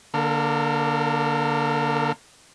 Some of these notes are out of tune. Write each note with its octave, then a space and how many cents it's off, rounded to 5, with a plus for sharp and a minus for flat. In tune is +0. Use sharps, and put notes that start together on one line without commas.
D3 +0 A#3 +20 A#4 -35